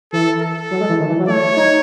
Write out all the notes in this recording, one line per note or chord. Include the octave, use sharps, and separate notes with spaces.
E3 A4
A4
F#3
G#3
E3
D#3
E3
F#3
A3 C#5
D#4